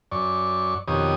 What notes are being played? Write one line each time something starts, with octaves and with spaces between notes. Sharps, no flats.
F#2 D5 C#6
F2 B2 D#3 G4 C#5 D#6